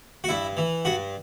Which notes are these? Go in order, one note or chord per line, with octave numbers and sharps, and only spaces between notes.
F#4
G2 E4
E3
G2 F#4